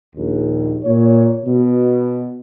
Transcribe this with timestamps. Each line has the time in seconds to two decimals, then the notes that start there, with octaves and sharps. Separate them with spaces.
0.15 A#1 D#2
0.84 A#2 C#5
1.45 B2